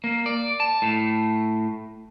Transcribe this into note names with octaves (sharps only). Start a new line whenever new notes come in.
A#3
D5
A5
A2